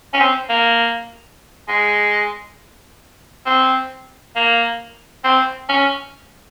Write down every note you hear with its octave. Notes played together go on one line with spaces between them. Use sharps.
C#4
C4
A#3
G#3
C4
A#3
C4
C#4